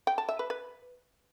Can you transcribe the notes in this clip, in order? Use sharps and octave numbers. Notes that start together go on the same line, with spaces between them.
G5
A5
E5
B4
B4